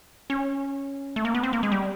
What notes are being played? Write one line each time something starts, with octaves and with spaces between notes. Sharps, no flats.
C#4
A3
A#3
B3
C4
A#3
G#3
G3